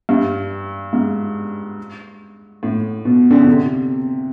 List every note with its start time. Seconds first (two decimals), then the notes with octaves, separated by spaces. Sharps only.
0.09 G2
0.93 G#2
2.63 A2
3.05 B2
3.31 D3
3.39 C#3
3.47 C3